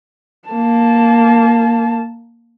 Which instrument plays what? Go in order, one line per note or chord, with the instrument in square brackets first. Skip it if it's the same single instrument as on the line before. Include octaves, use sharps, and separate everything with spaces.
[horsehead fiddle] A#3 A5